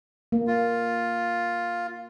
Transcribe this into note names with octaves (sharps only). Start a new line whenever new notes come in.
A#3
F4